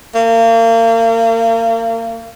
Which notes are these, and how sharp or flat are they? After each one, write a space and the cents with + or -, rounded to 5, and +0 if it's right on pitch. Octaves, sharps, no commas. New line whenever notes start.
A#3 -35